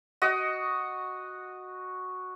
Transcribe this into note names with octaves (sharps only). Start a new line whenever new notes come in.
F#4 D#5